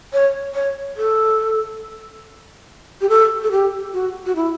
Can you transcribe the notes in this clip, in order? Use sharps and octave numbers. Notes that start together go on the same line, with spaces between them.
C#5
C#5
A4
G4
A4
A4
G4
F#4
F#4
E4